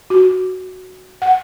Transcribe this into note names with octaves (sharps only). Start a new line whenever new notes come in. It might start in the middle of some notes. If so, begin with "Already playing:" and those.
F#4
F#5